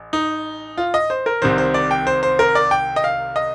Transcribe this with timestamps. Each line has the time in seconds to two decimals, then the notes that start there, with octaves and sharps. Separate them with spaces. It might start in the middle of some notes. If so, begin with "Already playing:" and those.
Already playing: A1
0.13 D#4
0.78 F4
0.94 D#5
1.10 C5
1.26 A#4
1.42 C2 C3 D#3 C5
1.58 C5
1.74 D5
1.91 G5
2.07 C5
2.23 C5
2.39 A#4
2.55 D5
2.71 G5
2.96 D#5
3.04 F5
3.36 D#5